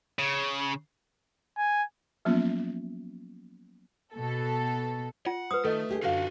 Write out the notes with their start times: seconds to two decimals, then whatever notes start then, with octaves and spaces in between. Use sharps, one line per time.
0.19 C#3
1.58 G#5
2.25 F3 F#3 A#3 B3 C#4 F4
4.14 B2 A4
5.26 F4 F#5
5.51 B4 C5 D#6
5.64 D#3 A3 A4 D#5
5.89 D2 G4 G#4
6.02 F#2 D3 F4 F#4 F5